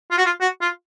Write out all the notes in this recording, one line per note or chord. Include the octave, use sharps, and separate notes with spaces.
F4
F#4
F4
F#4
F4